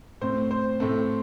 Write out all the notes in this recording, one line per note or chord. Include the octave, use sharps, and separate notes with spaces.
A2 A3 C4 C5
C5
A2 A3 C4 A4